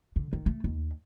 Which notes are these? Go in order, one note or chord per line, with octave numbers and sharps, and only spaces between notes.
D3
D#3
A3
D#2